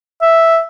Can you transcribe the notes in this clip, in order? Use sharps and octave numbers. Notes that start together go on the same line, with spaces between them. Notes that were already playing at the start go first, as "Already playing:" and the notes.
E5